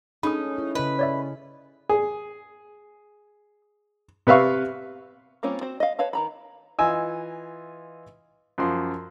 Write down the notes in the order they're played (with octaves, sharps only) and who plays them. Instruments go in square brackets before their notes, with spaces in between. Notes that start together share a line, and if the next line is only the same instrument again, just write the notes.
[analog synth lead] C#4 [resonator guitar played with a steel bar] D#4 [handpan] G#4 A4 [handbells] B5 D#6
[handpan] E4
[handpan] C#3 D#5 [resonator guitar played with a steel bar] B4
[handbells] C#5 D5 E5
[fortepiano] G#4
C3 B4 E5 F5 C#6
[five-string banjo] G3 A#3 C4 C#4 F4
C4 F#4 C5
D#5 F5
B4 C#5 F5 A5
D#3 A#5 B5
[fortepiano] E3 F4 D#5 G#5 E6
F#2 F3 C6